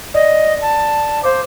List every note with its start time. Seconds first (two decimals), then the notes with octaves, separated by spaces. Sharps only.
0.14 D5 D#5
0.62 A5
1.23 C5 F5 D6